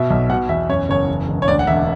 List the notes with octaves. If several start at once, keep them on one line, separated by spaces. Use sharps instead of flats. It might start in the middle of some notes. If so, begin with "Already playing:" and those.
Already playing: B2 E5
B1
B2 F#5
E2 E5
F#2 C#5
F#1 C#5
E2
E1
C#5
D2 D5
F#5
E1 E5